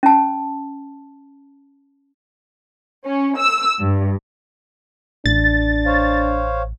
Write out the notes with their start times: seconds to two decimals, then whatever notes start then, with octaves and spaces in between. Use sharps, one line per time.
0.03 C#4 A5
3.05 C#4
3.38 E6
3.80 G2
5.26 A1 D4 A6
5.86 C5 C#5 F5